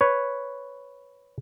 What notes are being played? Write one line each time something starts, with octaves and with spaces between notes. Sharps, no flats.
B4 C#5